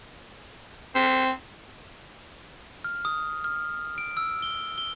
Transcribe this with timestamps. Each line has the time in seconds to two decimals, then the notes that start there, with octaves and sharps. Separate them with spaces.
0.95 C4
2.84 F6
3.05 D#6
3.44 F6
3.98 D7
4.17 E6
4.42 G7
4.78 G7